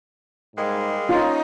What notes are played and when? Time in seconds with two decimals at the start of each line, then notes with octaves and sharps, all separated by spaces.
0.56 G#2 G3 G#3 A#3
1.09 C#4 D#4 F4